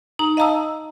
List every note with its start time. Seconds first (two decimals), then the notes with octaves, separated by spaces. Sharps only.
0.19 D#4 A#5
0.37 D#5 F5 A5 A#5 D#6 E6